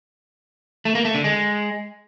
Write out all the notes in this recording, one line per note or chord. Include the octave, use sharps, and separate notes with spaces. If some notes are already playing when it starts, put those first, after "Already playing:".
A3
A#3
A3
D3
G#3